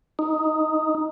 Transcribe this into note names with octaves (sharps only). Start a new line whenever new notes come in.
D#4